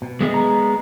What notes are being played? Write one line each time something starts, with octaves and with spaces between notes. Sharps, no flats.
B2
G#3 B3 G#4
A#5